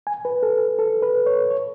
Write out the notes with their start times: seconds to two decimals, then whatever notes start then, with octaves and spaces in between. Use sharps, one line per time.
0.07 G#5
0.25 B4
0.43 A4
0.79 A4
1.02 B4
1.26 C#5
1.50 C#5